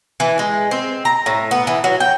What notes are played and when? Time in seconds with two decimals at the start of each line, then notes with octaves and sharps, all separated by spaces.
0.20 E3
0.39 G#3
0.71 C4
1.05 A#5
1.26 A2
1.51 B3
1.67 E3
1.84 F#3
2.00 G5